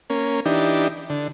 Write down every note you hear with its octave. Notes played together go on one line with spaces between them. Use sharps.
A#3 C#4
E3 D4 D#4 G4
D3